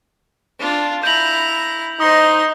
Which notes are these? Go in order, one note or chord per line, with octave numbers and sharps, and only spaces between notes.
D4 F4
E4 A#5 G6 F#7
D#4 C5 C6 D#6 A#6